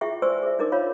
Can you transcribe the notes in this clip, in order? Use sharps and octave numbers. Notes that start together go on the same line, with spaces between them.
E4 F4 G#4 E5 G5 C#6
C5 D5 G#5 C6 C#6 E6
G#4 E5
D4 D#4 A#4 D6
F4 C#5 F5 B5